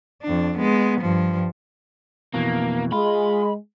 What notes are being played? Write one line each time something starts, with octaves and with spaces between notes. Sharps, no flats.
F2 D4
G#3 B3
G2 F3
F2 B2 E3 A#3
G#3 F4 B5